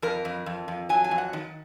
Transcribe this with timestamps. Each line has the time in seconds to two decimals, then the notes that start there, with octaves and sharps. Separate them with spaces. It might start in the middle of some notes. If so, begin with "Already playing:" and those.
0.02 F2 A#4
0.25 F2
0.46 F2
0.68 F2
0.89 F#3 G#5
1.04 G#5
1.11 F2
1.18 F#5
1.33 D#3